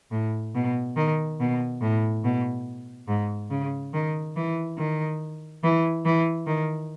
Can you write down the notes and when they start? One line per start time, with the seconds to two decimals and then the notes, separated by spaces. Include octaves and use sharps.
0.11 A2
0.55 B2
0.96 D#3
1.40 B2
1.81 A2
2.24 B2
3.08 G#2
3.50 C#3
3.93 D#3
4.36 E3
4.78 D#3
5.63 E3
6.05 E3
6.47 D#3